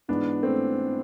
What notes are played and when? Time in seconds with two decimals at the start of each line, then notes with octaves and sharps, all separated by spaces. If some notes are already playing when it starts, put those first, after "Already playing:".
0.08 G#2 E3 B3 D4
0.43 A3 C4